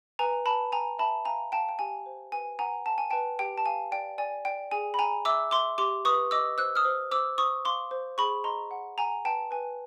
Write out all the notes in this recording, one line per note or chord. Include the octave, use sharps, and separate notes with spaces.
B4 G#5 A#5
B4 A5 B5
G5 G#5 A#5
E5 A5 B5
F5 G#5 A#5
F5 G5 A5
G5
G4 G#5
C5
B4 G#5
F#5 G#5 A#5
F#5 A5
G#5
B4 G5 A5
G4 G5
A5
F5 G#5
D5 G5
D5 G#5
D5 G5
G#4 G#5
B5
G5 G#5 A#5
E5 D6 E6
E5 C6 D6
G4 C6 D6
B4 C#6 D#6
D#5 D6 E6
C5 E6 F#6
D#6 F6
C5
C5 D6 E6
C5 C#6 D#6
F5 C6 D6
C5
G#4 B5 C#6
D#5 A#5 C6
F#5
F#5 G#5 A#5
B4 G5 A5
B4 G#5